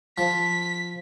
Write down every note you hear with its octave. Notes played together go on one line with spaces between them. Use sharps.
F3 B6